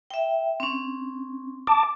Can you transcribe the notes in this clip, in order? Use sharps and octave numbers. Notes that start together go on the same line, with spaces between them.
E5 G5
C4 C#4
A5 D6